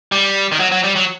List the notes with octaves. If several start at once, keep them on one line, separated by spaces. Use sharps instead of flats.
G3
D#3
F#3
F#3
G3
F#3